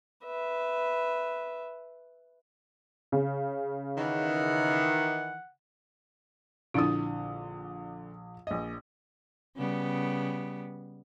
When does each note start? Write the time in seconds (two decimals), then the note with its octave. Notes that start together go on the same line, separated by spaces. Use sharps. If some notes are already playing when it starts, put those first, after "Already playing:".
0.24 B4 E5
3.12 C#3
3.98 D#3 E3 F#5
6.74 A#1 D3 C4 D4 E4 D#6
8.47 A#1 D#5
9.56 C#3 G3 B3